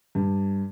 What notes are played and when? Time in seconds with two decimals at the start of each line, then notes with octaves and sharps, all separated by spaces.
0.15 G2